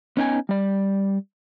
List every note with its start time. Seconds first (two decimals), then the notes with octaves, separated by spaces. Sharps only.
0.17 B3 C#4 D#4 E4 G5 G#5
0.49 G3 D5